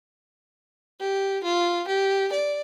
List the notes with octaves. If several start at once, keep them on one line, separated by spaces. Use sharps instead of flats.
G4
F4
G4
D5